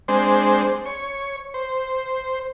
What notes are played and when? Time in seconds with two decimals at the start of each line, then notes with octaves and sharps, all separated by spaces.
0.08 G#3 C4 D4 C5
0.86 C#5
1.54 C5